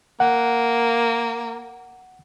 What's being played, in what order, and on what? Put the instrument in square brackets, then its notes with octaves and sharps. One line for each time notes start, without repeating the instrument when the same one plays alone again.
[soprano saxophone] A#3 [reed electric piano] F#5